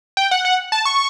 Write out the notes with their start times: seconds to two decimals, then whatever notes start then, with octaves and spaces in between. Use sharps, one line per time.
0.17 G5
0.31 F#5
0.45 F#5
0.72 A5
0.85 C#6